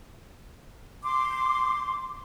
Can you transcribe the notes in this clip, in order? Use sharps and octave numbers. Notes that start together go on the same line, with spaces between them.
C6 D6